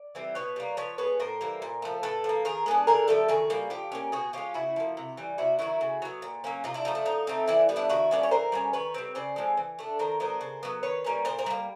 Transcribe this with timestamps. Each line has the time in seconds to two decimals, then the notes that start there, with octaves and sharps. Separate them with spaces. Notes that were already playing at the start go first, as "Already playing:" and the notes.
Already playing: D5
0.15 E3 G3 C4
0.35 B2 B4 C#5
0.56 G3 A#3
0.77 F3 B4 C#5
0.98 G#3 B3 B4 C#5
1.20 A2 A#4 C5
1.41 E3 G3 A#3
1.62 A#2
1.82 F3 A3
2.03 A2 A4 B4
2.24 F3
2.29 A#3
2.45 D#3 G#4 A#4
2.66 G#3 B3 D4
2.87 D3 G#4 A#4
3.07 F3 A3 G4 A4
3.28 D#3 F#4 G#4
3.50 G3 A#3
3.70 F3 F4 G4
3.92 A#3 C#4
4.12 B2 F#4 G#4
4.33 G#3 C#4 F4 G4
4.54 C#3 E4 F#4
4.76 F3 A#3
4.97 C3
5.17 E3 G3
5.38 C3 E4 F#4
5.59 D#3 F#3 E4 F#4
5.81 C#3
6.02 F#3 B3
6.22 A#2
6.44 F#3 A#3 C#4
6.64 C3 D#4 F4
6.74 D4 E4
6.85 F3 A3 D#4
6.95 D4
7.05 F3 D#4
7.27 A3 C4
7.48 E3 D4 E4
7.69 G3 B3
7.76 D4 E4
7.89 D#3 E4 F#4
8.11 G3 A#3 C#4 D5
8.23 C#5
8.31 E3 A#4 C5
8.52 G3 A#3 C#4
8.73 D#3 B4 C#5
8.94 G3 C4
9.15 C#3 C5 D5
9.36 F3 G#3 C4
9.57 E3
9.79 A3 D4
9.99 D#3 A#4 C5
10.20 F#3 B3 D4 A#4 C5
10.41 C#3
10.63 F#3 B3
10.83 D#3 B4 C#5
11.04 G3 A#3 C#4
11.25 A#2 A#4 C5
11.39 A#4 C5
11.46 G3 A#3